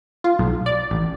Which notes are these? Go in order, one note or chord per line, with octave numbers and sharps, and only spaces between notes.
F4
B1
D5
A1